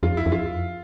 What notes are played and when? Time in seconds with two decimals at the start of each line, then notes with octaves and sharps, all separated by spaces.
0.03 F2 F4
0.17 E4
0.26 F2
0.32 F4